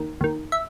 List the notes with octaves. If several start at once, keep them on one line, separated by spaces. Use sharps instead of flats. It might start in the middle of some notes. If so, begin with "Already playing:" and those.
Already playing: D#2 D#3
D#2 D#3
E5